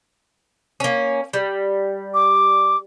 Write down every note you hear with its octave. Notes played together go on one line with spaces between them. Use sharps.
A#3 C#4
G3
D6